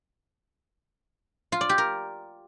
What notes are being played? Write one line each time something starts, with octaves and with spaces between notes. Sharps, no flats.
F4
D5
G4
A#4